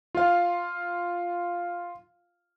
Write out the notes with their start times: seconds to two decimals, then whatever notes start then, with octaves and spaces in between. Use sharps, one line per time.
0.15 F4 F5